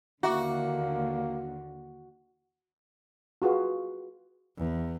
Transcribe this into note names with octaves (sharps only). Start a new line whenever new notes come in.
D#2 D3 A#3 E4 F#4 E5 D6
F4 F#4 G#4 B4 F5
E2